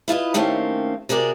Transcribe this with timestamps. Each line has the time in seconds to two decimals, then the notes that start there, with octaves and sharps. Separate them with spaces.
0.08 E4 F4 B4 D#5
0.34 D#3 A3 A#3 C4 C#4 G4
1.09 C3 F#4 G#4 A#4 D5